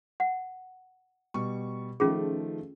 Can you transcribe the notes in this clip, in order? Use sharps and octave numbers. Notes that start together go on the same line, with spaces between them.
F#5
B2 G3 C#6
D#3 F3 A3 C#4 F4 G#4